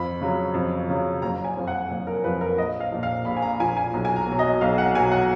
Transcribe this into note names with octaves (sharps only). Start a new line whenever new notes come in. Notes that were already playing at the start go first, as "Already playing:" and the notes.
Already playing: F2 B5
C#3 F#3
F2
C#3 F#3
F#1 A#5
G#5
F2 F3
F#5
F#1
A#4
F2 F3 B4
A#4
A#1 D#5
F5
A#2 F3
F5
A#1 B5
G#5
A#5
A#2 F3 G#5
G#5
B1
G#5
A#5
B2 F#3
D#5
B1 F5
F#5
B2 F#3 G#5
F#5